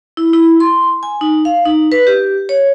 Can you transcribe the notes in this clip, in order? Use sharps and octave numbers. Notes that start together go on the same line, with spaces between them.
E4
E4
C6
G#5
D#4
F5
D#4
B4
G4
C#5